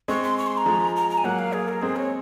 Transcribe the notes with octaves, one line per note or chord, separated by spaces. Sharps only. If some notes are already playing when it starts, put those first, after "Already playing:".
G#3 C4 C#6
C6
C#6
C6
A#5
F3 G#3
A#5
A#5
G#5
F#3 A#3 F#5
F5
G#4
A#4
G#3 C4 G#4
C#5